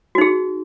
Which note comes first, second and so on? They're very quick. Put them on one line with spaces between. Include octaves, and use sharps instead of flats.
F#4 D#4 G#4